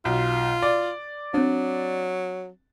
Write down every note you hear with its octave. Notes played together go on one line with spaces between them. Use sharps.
B1 F4
D5
F#3 C4 D4